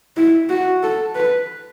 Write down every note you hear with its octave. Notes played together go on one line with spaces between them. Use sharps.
E4
F#4
A4
B4